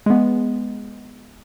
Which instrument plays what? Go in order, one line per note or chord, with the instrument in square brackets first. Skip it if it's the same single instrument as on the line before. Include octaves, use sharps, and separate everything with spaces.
[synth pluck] G#3 B3